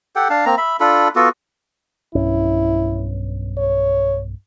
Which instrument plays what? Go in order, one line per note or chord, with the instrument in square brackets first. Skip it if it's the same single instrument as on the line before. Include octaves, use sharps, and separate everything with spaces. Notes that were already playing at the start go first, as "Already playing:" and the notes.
[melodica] G4 A4 F#5 G5
D4 F5 A5
A#3 C4 A#5
E5 B5
D4 F4 A4 B5
B3 F4 F#4 A4
[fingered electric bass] B1 G2 C#4 [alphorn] E4
[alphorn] C#5